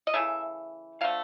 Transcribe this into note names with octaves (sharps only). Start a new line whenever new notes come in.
D#5
C#3 E3 A3 E5
D3 F3 A3 F5